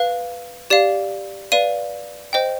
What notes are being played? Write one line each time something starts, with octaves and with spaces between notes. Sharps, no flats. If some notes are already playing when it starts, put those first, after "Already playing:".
Already playing: B4 F5
G4 D5 F5
B4 D5 F5 D#7
C5 D#5 G5